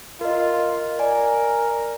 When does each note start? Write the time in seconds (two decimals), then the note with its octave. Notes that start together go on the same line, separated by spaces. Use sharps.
0.21 F4 A#4 D#5
0.99 A#4 D5 G#5